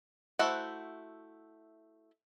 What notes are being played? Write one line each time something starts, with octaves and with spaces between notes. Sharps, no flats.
A3 E4 F#4 C5 F#5